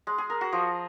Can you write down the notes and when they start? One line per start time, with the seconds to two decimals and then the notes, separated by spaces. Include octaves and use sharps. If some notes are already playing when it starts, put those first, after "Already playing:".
0.07 G#3
0.18 G#4
0.30 A#4
0.41 F#4
0.52 F3